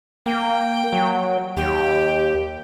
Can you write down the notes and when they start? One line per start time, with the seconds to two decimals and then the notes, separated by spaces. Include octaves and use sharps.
0.26 A#3 G5
0.93 F#3
1.57 D#2 G4